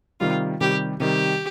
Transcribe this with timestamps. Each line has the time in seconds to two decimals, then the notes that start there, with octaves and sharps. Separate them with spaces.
0.20 C3 D#3 G3 F4
0.61 C3 D#3 G3 G4
1.00 C3 D#3 G3 G4